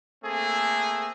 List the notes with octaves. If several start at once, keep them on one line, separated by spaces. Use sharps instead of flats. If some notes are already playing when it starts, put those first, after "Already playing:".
A3 A#3 C4 G#4 A4